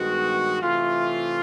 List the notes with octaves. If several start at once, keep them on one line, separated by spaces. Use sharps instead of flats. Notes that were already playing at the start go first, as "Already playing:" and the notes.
Already playing: G2 D#3 G#3 B3 F#4
C3 E3 A3 F4